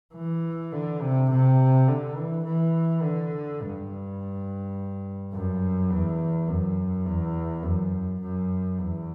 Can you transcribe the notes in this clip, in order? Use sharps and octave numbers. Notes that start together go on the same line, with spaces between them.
E3
D3
C3
C3
D3
E3
E3
D3
G2
F#2
E2
F#2
E2
F#2
F#2
E2